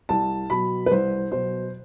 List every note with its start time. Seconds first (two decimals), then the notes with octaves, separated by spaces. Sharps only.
0.09 C2 A5
0.50 B2 F#3 B5
0.86 B4
0.91 C2 C5
1.32 B2 F#3 C5